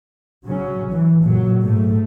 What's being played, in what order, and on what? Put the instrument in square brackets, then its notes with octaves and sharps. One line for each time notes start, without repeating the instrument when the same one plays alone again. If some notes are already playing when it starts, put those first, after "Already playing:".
[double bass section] C#3 F#3 C#4
E3 F#3
F#1 A#2 F#3
G#2 A3